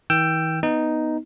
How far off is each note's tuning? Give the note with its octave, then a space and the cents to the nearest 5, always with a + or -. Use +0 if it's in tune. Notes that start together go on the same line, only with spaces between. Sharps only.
E3 -45 G5 +0 E6 +20
B3 +0 D#4 +0